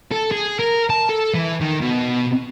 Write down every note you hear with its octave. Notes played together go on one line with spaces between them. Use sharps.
A4
G#4
A#4
A5
A4
E3
D#3
B2